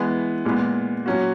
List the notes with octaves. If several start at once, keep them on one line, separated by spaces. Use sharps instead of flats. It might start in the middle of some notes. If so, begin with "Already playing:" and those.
Already playing: E3 G#3 B3
A#2 G#3 B3
A#2 F#3 C#4 F#4